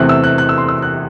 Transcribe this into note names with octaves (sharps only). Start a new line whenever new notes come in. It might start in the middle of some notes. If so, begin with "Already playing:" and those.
Already playing: E2 C3 E3 A3 C4 F#6
E6
F#6
F#6
E6
C6
E6
F#6